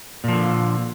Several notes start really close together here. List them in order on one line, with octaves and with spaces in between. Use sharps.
A#2 F3 D3